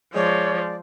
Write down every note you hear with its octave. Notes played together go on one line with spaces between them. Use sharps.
F3 G#3 C#5 D5